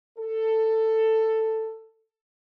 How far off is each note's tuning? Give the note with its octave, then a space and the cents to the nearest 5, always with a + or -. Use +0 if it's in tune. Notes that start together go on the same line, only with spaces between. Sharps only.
A4 +10